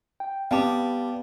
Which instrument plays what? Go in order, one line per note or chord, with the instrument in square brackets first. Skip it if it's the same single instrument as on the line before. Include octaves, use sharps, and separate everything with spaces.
[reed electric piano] G5
[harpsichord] G3 [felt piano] B3 [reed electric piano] F5 A5 D6